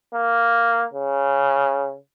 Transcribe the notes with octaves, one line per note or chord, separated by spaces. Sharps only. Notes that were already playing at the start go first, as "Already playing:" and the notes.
A#3
C#3